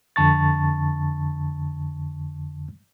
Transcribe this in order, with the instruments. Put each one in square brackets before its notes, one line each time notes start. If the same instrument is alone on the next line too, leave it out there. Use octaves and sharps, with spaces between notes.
[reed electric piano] F2 D3 A5 C#6 A6